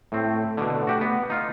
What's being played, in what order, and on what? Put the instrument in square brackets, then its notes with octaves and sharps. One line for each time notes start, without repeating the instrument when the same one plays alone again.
[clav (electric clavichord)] A2 C4 [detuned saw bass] A3
[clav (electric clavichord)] B2 D3
F#4 G4 F#5
B3
D#4 F4